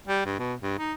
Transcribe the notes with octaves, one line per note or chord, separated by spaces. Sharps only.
G3
G2
B2
G2
D#4